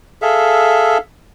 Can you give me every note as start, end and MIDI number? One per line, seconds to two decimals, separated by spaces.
0.22 0.98 68
0.22 0.98 69
0.22 0.98 76
0.22 0.98 77